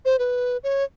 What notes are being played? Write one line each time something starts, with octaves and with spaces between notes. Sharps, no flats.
C5
B4
C#5